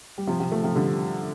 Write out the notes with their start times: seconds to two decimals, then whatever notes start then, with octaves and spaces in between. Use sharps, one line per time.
0.18 G3
0.27 C3 F3
0.40 C3 F3
0.52 F3 A3
0.64 C3 F3
0.76 D3 G3